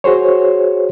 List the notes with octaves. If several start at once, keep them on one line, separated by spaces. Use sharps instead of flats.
F#4 G#4 C5 C#5